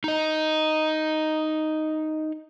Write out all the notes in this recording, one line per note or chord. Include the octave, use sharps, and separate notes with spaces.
D#4 D#5